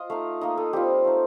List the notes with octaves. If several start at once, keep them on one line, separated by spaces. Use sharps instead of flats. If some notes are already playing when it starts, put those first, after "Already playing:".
Already playing: F4 D#5
A3 D#4 F5
A#3 D#4 D#5
A4
G3 C4 F4 G4
A3 D#4